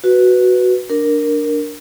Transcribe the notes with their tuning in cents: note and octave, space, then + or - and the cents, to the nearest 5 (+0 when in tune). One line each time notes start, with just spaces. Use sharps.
F#4 +0 B4 +0
D4 +0 A#4 +0